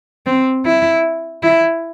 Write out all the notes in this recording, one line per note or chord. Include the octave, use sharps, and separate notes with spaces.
C4
E4
E4